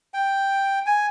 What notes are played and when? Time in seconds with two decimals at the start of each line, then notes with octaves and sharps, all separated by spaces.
0.14 G5
0.86 G#5